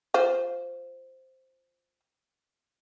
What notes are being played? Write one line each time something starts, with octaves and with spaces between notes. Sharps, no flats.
F4 C5